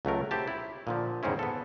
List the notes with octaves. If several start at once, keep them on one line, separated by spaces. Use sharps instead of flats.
C#2 F#3 A3 A#4
C4 E4 G4 A5
E4
A#2 D3 F3
E2 G#2 C#3 C4 C#4 E4
B3 A4